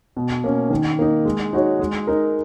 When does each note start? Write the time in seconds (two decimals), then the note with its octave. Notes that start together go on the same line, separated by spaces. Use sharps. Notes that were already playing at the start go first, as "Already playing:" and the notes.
0.17 B2
0.44 A#3 C#4
0.70 D#3
0.99 A#3 D#4
1.25 G#3
1.53 D#4 F#4 C#5
1.79 G#3
2.07 D#4 A#4